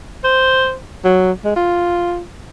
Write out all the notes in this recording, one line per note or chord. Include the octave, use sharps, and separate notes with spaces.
C5
F#3
G#3
F4